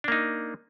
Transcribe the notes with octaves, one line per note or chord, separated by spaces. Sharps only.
A#3 D4 D#4